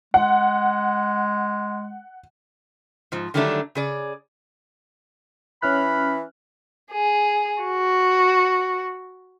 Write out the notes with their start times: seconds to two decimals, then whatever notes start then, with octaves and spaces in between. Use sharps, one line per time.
0.14 G#3 F#5
3.12 G#2 F3
3.34 D3 D#3 F#3 G3 A3 D4
3.75 C#3 G#4 D5
5.62 E3 C#4 B5 F6 F#6
6.91 G#4
7.62 F#4